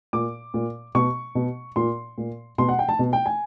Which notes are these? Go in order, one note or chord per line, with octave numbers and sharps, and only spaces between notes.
A#2 D6
A#2
B2 C#6
B2
A#2 C6
A#2
B2 C6
F#5
G5
A5
B2
G5
G#5